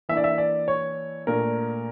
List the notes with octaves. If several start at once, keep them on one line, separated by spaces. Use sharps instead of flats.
E3 A#3 D4 E5
D5
E5
D5
C#5
A#2 A3 D4 A#4